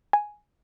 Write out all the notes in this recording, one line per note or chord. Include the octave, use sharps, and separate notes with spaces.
G#5